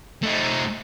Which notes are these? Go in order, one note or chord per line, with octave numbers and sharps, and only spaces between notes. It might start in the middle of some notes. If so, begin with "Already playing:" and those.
A3 D#4